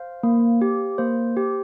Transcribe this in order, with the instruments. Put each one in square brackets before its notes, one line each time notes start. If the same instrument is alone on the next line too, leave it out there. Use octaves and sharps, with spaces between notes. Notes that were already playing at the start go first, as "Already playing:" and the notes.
Already playing: [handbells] C5 F5
A#3
G4
A#3 C5
G4